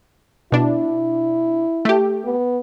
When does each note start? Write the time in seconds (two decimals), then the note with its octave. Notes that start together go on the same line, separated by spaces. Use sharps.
0.52 B2 D4 E4
1.85 A3 G4
2.25 B3